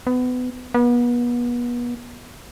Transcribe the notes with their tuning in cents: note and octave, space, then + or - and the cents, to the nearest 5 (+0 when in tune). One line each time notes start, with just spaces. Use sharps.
B3 +25
B3 -35